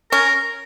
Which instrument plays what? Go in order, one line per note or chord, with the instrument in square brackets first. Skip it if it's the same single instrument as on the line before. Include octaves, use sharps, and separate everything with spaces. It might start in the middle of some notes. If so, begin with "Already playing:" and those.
[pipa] C#4 [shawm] A#4